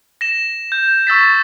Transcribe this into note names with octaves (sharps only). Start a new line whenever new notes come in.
A#6 E7
G6
C#6 E6 A6 B6